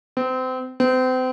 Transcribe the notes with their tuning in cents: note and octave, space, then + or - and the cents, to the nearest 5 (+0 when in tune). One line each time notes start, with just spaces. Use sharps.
C4 -30
C4 -35